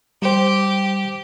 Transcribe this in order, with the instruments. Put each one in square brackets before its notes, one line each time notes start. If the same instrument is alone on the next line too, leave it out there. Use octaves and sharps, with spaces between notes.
[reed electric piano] G3 C5 [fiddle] G4